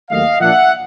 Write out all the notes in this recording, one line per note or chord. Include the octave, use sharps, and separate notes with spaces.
D#2 D#3 F#3 A3 D#5 F5
A#2 F3 A#3 D4 E5 F#5